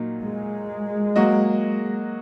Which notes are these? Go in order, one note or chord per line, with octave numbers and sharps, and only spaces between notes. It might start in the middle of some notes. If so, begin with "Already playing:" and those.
Already playing: A#2 F#3 A#3 D#4
G#3
F#3 A#3 F#4 D#5